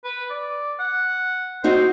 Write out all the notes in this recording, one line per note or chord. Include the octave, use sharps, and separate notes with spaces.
B4
D5
F#5
C4 D#4 F#4 C5